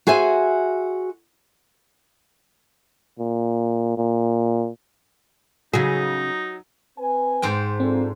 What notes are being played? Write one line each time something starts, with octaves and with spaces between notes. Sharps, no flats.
F#4 G#4 C5 E5 G#5
A#2
A#2
C#3 F#3 D#4 G#4
C4 B4 G#5
G#2 C5 G5
C4 D4 F4 A4